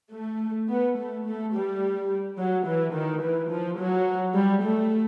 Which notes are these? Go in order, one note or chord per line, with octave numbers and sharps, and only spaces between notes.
A3
B3
A3
A3
G3
F#3
E3
D#3
E3
F3
F#3
G3
A3